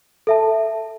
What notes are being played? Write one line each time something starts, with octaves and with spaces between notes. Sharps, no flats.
A4 E5 A5